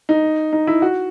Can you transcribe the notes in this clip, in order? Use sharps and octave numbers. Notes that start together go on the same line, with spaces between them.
D#4
D#4
E4
F#4